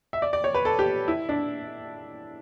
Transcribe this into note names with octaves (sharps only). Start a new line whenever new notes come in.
E5
D5
D5
C#5
B4
A4
G4
E4
D4